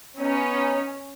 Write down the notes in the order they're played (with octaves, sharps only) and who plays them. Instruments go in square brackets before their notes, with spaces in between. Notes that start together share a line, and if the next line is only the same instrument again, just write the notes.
[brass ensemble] B3 D#4 [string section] C#4